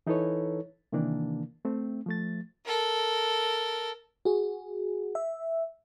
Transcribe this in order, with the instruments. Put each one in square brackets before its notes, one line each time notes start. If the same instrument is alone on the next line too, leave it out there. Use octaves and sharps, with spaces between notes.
[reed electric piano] E3 D#4 E4 A4 B4 C#5
C3 D#3 E3 A#3 D4
A3 C4
F3 A3 A6
[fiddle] A4 A#4
[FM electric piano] F#4 G#4
E5